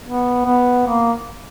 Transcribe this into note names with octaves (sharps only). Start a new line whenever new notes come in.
B3
B3
A#3